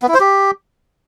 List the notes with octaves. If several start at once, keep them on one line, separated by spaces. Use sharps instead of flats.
B3
E4
C5
G4